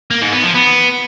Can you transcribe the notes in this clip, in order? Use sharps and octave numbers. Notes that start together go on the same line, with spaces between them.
A#3
G#2
B3
F3
B3